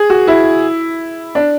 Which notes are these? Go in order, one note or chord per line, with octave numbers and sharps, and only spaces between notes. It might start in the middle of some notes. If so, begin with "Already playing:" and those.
Already playing: G#4
F#4
E4
D4